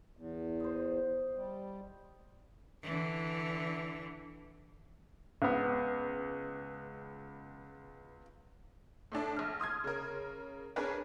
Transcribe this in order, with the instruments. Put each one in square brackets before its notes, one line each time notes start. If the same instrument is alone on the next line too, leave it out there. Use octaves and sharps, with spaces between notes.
[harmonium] E2
[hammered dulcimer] C5 D#5
[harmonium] G3
[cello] D3 E3
[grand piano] C#2 B3
[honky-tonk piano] A2 A3 D4 A5
A#1 F6
C6 D#6 F6 G#6
C#3 A#4
C#4 D4 G#4 A#4 B4 C#5